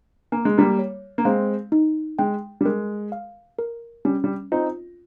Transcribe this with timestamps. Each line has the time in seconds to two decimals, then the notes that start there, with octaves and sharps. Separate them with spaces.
0.32 A#3 G#5
0.45 G#3
0.58 G3 A#3
0.79 C#5
1.18 A#3
1.25 G#3 C4 F5
1.72 D#4
2.19 G#3 G5
2.61 G3
2.65 G#3 A#4
3.12 F5
3.59 A#4
4.05 G3 C#4
4.24 G3
4.52 C4 D#4 F4